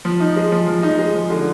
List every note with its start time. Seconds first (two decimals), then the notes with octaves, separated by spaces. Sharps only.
0.05 F3
0.20 D#4
0.37 G#3
0.52 F3
0.68 F3
0.83 D#4
0.99 G#3
1.15 F3
1.30 D3